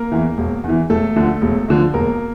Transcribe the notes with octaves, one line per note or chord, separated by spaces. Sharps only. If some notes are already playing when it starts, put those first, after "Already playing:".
Already playing: A#3 A#4
E2 E3
E1
E2 E3
E1 A3 A4
D2 D3 F3
E1
D2 D3 F3
E1 A#3 A#4